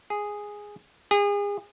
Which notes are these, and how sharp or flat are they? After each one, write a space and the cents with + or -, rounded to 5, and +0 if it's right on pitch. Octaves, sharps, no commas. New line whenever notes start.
G#4 -5
G#4 -35